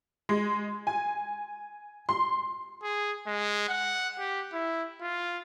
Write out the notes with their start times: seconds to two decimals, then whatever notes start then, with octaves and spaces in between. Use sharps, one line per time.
0.29 G#3
0.87 G#5
2.09 C6
2.83 G#4
3.27 G#3
3.69 F#5
4.18 G4
4.53 E4
5.01 F4